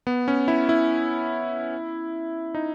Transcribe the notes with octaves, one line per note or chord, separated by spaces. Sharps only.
B3
C#4
E4
E4
D#4